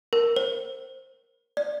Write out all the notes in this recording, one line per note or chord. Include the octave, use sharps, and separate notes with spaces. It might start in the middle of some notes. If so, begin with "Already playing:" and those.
A#4
C5
D5